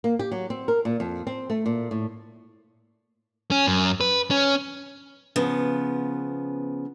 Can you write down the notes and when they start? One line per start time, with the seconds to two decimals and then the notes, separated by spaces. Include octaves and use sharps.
0.04 A#3
0.19 G4
0.32 F#3
0.50 C4
0.68 A#4
0.85 A#2
1.00 F2
1.27 C4
1.50 A3
1.66 A#2
1.91 A2
3.51 C#4
3.67 F#2
4.00 B4
4.31 C#4
5.36 C#3 F3 B3